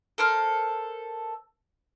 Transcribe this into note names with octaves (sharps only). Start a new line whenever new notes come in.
A4 A#4 C5 F6